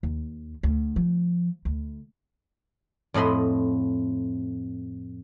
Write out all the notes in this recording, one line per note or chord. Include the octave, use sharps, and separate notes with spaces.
D#2
D2
F3
D2
F2 A2 D#5 B5 C6